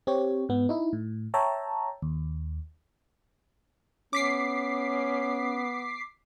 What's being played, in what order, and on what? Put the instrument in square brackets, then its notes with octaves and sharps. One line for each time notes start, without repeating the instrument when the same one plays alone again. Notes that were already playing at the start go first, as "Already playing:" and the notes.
[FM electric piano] C4 G4 C#5
G#2 B3
D#4 E4
A2
C#5 E5 G5 A5 A#5
D#2
[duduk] B3 [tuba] C#4 [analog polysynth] D6 B6 C7